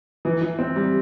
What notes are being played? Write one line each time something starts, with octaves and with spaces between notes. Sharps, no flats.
E3
E3
C4
G3